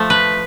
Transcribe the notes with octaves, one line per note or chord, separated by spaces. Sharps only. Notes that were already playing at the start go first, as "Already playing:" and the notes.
Already playing: F3 A3
B4